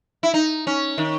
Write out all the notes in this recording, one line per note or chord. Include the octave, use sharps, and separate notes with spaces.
E4
D#4
C#4
D#3